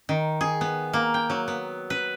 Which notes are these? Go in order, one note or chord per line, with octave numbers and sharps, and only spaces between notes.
D#3
G#4
B3
A#3
G5
F#3
B3
B4